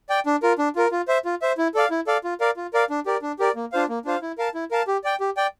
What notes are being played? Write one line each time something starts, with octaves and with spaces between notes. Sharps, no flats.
D5 G5
D4
F4 A#4
D4
F4 A#4
F4
C5 E5
F4
C5 E5
E4
A4 D5 F5
E4
A4 D5 F5
F4
A#4 D5 F5
F4
A#4 D5 F5
D4
G4 A#4 D5
D4
G4 A#4 D5
A#3
D4 F4 C5 F5
A#3
D4 F4 C5 F5
E4
A#4 F5 A5
E4
A#4 F5 A5
G4
D5 G5
G4
D5 G5